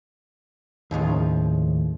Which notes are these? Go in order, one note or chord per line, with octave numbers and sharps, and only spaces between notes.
D#2 A2 C#3 F3